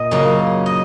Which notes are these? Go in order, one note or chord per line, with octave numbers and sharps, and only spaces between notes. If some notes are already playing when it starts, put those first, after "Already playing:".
Already playing: A#2 D#5
F#2 C#3 F#3 A#3
D#5